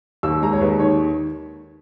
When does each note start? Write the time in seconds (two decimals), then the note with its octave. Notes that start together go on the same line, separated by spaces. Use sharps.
0.23 D#2 E6
0.42 G#3 A#5
0.53 C#5
0.61 D#2 B4
0.80 D#3 C#5